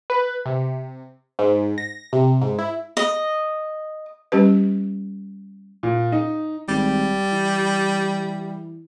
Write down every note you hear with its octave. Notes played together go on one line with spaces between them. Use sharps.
B4
C3
G#2
A#6
C3
G#2
E4
D#5
G3 C#4 G4 B4
A#2
D#4
G#1 G3
E3